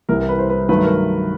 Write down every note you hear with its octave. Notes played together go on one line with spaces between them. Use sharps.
C2 C3 E3 A#4
A#4
B4
C5
B4
G2 D#3 F#3 A3 B4
A#4